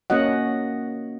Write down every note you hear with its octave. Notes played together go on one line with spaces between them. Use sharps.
A#3 C#4 F#4 D#5 F#5